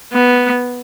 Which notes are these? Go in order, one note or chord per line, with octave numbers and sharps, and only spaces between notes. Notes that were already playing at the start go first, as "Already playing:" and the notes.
B3